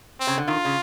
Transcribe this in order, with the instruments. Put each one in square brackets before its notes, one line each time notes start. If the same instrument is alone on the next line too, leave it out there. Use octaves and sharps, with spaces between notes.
[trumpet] C4
[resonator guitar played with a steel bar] C#3
D3
[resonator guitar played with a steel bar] D#3 [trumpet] F4
[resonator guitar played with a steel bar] C#3